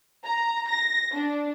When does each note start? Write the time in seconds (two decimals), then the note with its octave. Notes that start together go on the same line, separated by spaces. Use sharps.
0.24 A#5
0.69 A#6
1.14 D4